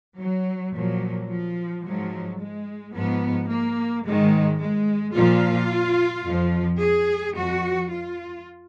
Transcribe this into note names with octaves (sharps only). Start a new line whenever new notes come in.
F#3
A#2 F3 F#3
F3
G#2 F3 F#3
G#3
G#2 F3 B3
A#3
G#2 D#3 G#3
G#3
A#2 F3 F4
F2 F3
G#4
F2 F3 F#4
F4